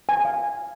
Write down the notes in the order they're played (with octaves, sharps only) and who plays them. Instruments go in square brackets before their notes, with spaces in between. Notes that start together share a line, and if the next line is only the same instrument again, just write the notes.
[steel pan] G#5
F5